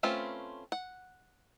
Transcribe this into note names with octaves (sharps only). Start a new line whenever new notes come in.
A3 C4 C#4 F4 B4
F#5